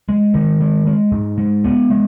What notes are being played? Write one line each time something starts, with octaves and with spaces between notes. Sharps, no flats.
G#3
D#3
G#3
G#3
G#2
G#3
B3
G#3